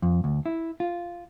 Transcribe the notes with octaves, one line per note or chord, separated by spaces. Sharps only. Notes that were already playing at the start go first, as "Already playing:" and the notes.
F2
D2
E4
F4